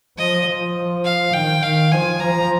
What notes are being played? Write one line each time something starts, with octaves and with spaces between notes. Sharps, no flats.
F3 D#5
F3
F5
D#3 G5
D#3 F5
F3 G#5
F3 A#5